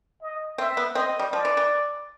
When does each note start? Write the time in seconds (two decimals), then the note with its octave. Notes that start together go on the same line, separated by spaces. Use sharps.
0.22 D#5
0.58 C4 E5
0.77 B3
0.95 C4 D#5
1.19 G3
1.32 F3 D5
1.45 E3
1.57 E3